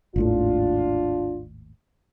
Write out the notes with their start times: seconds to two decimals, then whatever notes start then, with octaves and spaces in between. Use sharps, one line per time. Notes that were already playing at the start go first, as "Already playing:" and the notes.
0.16 G#1 D#2 A2 D4 F4